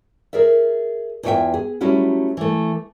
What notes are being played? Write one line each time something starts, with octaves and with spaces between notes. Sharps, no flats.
G#4 A#4 D5 E5
E2 E3 F4 C#5 E5 G5
G#4
F#3 G3 A3 C#4 E4 F#4
E3 A3